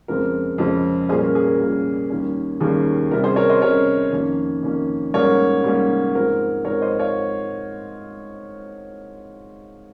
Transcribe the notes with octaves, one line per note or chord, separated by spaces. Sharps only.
F2 C#3 G#3 C4 A#4
F2 C#3 G#3 C4
A#2 G3 A#3 C#4 G#4 C5
A#4
G#4
A#4
A#2 G3 A#3 C#4 A#4
D#2 D#3 G3 A#3 C#4
D#2 D#3 G3 A#3 C#4 G#4
C3 G3 C#4 A#4
G#4 C5
A#4 C#5
C5 D#5
C3 G3 C#4 A#4 C#5
F2 D#3 A#3 C#4
F2 D#3 A#3 C#4
G#2 G3 A#3 C#4 A#4 C#5
G#2 G3 A#3 C#4
G#2 F3 C4 A#4
G#2 F3 C4 A#4 C#5
C5 D#5
C#5 F5